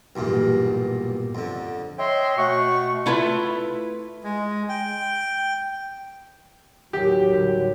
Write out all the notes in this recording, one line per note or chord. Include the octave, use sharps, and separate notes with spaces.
B1 E2 G2 A#2
F2 D3
C#5 D#5 E5 G5 C6
B2 A3 F#5 C#6
A3 E4 F4 B4
G#3
G5
A1 D#2 F#3 G4
A2 D3 G3